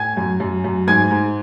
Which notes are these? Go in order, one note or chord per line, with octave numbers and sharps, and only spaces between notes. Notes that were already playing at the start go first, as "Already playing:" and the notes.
Already playing: A2 G#5 G#6
F#2
F#2
F#2
G#2 G#5 G#6
G#2